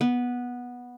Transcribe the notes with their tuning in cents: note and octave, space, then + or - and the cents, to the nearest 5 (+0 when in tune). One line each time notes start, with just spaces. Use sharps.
B3 -10